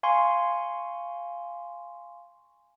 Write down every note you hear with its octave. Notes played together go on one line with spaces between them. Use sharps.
F5 G#5 C6 C#6